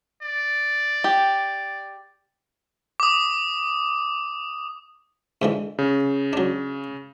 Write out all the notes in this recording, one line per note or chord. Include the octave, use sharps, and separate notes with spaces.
D5
G4
D6 D#6
G#2 D3 E3
C#3
F#3 D4